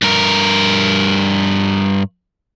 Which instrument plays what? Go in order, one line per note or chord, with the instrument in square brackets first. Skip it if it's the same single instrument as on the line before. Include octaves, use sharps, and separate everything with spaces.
[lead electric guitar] G2 A#4